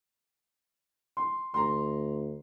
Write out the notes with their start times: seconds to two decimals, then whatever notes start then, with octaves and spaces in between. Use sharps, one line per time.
1.17 C6
1.54 D2 A#5 C6